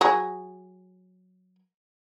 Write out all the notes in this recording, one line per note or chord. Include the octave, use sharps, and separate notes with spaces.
F#3 G#4